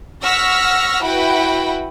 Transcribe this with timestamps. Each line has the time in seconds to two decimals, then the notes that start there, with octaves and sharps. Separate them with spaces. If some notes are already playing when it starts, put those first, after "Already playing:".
0.23 F#5 C#6 E6 F6 A#6 B6
1.03 E4 F#4 B4 F#5 G5 B5